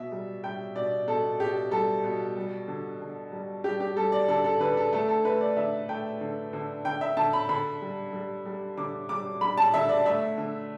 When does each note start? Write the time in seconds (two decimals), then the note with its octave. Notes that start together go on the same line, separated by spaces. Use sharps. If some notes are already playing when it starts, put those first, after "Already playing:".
Already playing: B2 E5
0.12 G3
0.44 G3 G5
0.76 B2 D5
1.08 B2 A4
1.40 B2 G4
1.71 G3 A4
2.04 B2
2.37 G3
2.68 D3
3.00 D3
3.32 G3
3.64 G3 G4
3.80 G4
3.96 G3 A4
4.12 D5
4.28 D3 A4
4.44 A4
4.60 D3 B4
4.77 A4
4.93 A3 A4
5.09 A4
5.25 A3 B4
5.41 D5
5.57 D3 E5
5.89 A3 G5
6.21 D3
6.53 D3
6.85 D3 G5
7.01 E5
7.17 D3 A5
7.33 B5
7.49 D3 B5
7.82 G3
8.13 G3
8.46 G3
8.77 D3 D6
9.09 G3 D6
9.41 G3 B5
9.58 A5
9.74 D3 E5
9.89 D5
10.06 A3 E5
10.38 D3